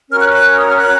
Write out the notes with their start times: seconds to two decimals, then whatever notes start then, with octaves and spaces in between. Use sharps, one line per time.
0.09 C#4 F#4 A#4 C#5 F6
0.20 F#6
0.31 F#6
0.57 D#6
0.66 F6
0.76 F#6